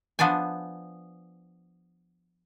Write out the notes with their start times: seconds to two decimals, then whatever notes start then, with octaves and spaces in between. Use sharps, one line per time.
0.19 F3 B3 D4 D5 G#5